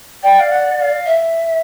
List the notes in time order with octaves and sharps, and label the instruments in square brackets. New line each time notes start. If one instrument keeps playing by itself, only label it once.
[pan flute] D5 [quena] G5
[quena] F5
F#5
F#5
F5
[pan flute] E5